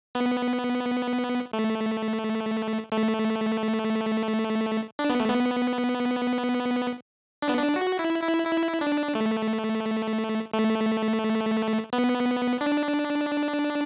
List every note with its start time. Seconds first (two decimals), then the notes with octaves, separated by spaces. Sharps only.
0.15 B3
1.53 A3
2.92 A3
4.99 D4
5.09 B3
5.20 A3
5.29 B3
7.42 D4
7.49 B3
7.58 D4
7.76 F#4
7.99 E4
8.23 E4
8.46 E4
8.81 D4
9.15 A3
10.53 A3
11.93 B3
12.61 D4